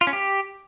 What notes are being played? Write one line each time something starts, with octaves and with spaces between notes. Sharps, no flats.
F4
C#4
G4